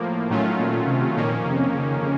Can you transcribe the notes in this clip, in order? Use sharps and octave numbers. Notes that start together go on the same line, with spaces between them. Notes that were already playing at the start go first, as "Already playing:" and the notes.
Already playing: A2 F3 A#3
A2 D#3 F#3 A3 C#4 F4
A#2
C3
F2 A#2 D#3 A#3 C#4
C3
C#3
C#3